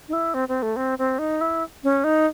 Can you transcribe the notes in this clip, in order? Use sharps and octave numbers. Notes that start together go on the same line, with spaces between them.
D#4
E4
C4
C4
A3
C4
C4
D#4
E4
C#4
D#4